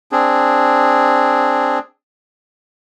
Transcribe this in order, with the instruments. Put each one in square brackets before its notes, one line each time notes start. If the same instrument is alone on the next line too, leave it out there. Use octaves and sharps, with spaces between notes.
[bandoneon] C4 D4 G#4